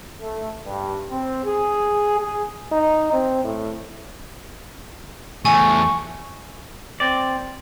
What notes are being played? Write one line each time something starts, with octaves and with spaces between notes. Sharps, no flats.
A3
G2
C4
G#4
G#4
D#4
C4
A2
E2 A3 G#5 C#6
C4 D5